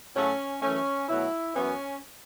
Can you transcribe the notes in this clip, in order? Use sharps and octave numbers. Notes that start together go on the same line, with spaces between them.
A2 F#3 A3 C#4
F#2 E3 A3 C#4
B2 F#3 A3 E4
F#2 E3 B3 C#4